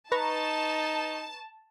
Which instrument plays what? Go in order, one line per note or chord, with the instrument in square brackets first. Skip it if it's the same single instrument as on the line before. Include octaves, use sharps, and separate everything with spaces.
[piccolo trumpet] D#4 [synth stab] B4 A#5 C#6 [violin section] A5